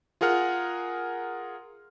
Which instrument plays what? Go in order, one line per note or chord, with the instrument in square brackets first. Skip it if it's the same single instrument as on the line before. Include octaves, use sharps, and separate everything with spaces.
[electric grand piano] F4 G#4 A#4 F#5 F6